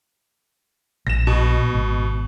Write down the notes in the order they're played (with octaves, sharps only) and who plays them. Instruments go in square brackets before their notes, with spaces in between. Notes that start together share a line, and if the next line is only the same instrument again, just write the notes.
[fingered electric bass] A#1 [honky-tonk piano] A#6 E7
[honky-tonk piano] B2
[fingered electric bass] G#1